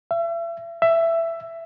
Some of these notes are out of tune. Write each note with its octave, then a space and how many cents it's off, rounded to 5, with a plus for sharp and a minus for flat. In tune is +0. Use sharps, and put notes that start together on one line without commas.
E5 +40
E5 +15